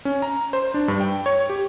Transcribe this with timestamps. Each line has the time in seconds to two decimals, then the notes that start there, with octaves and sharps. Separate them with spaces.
0.05 C#4
0.22 A#5
0.53 C5
0.74 D4
0.88 G2
1.00 G5
1.26 C#5
1.50 G4